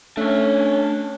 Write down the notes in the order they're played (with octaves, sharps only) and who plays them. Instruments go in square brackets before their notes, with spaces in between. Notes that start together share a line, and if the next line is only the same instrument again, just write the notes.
[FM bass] A3 [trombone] C#4 [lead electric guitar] D4 C#5